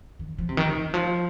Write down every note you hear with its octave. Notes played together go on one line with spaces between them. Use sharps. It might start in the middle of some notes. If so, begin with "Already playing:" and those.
D#3
F3
C3
D#3
D#3
F3